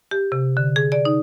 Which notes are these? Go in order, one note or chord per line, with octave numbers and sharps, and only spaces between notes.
G4
C3
D3
G#4
D5
D#4